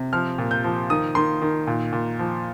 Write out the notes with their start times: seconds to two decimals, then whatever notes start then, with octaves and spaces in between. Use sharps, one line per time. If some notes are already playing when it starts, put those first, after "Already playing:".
Already playing: C3
0.13 F3 F6
0.38 A#2
0.51 G6
0.64 F3
0.90 D#3 D#6
1.15 D#3 C6
1.42 D#3
1.67 A#2
1.93 A#2
2.19 F3